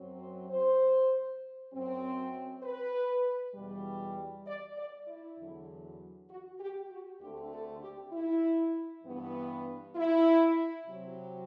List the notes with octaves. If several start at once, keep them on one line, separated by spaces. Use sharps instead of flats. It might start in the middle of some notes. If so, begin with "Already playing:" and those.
Already playing: F#2 F#3 C4
C5
C5
F#2 F#3 C4
B4
E2 B2 G3
D5
D5
E4
E2 D3 F#3
F#4
G4
F#4
D2 D3 A3 C4 G4
A4
G4
E4
G2 E3 B3
E4
C3 F#3 C4